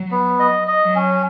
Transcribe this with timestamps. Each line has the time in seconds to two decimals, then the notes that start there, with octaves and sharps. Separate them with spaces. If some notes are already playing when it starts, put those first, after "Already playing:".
Already playing: F#3
0.11 B3
0.39 D#5
0.67 D#5
0.82 F#3
0.96 C#4